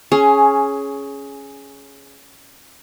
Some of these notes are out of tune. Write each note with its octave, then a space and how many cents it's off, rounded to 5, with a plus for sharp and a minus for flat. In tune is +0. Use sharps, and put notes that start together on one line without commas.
C#4 +0 G#4 +15